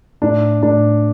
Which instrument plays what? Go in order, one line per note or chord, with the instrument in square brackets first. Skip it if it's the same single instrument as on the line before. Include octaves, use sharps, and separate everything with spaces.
[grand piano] A2 D4
A2 D4